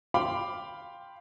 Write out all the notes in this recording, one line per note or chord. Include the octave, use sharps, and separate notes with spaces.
F5 G5 B5 C6 D6